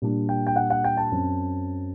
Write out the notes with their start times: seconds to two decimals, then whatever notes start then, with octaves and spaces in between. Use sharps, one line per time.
0.02 A#2 G3 D4
0.29 G5
0.47 G5
0.56 F#5
0.70 F#5
0.84 G5
0.97 A5
1.12 F#2 F#3 C4